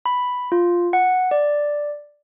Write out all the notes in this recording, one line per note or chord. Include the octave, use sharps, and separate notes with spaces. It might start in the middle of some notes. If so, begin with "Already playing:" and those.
B5
F4
F#5
D5